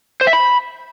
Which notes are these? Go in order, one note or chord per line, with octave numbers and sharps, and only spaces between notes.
C5
E5
B5